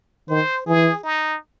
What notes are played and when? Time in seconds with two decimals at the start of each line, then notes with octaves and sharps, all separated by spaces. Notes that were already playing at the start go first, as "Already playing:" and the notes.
0.29 D#3 C5
0.67 E3 G#4
1.04 D#4